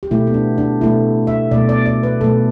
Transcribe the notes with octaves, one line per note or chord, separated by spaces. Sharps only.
G4
B2 A3 E4
B3
D4
D4
B2 A3 E4
E5
B2 A3 D5
D5
D5
B4
B2 A3 A4